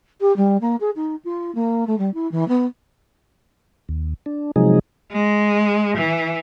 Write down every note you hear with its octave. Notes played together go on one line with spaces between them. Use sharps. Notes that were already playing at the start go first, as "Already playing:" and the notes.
G4
G3
A#3
G#4
D#4
F4
A#3
A3
G3
E4
E3
B3
D#2
D4
C3 F3 F#3 G#3 D#4 G#4
G#3
E3